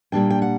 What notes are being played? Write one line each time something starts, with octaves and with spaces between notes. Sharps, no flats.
A#2 G3 A#3 D4 G5
G5
F#5